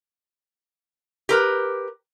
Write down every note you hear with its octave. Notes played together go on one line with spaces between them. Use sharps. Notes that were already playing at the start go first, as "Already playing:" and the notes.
G4 A#4 B4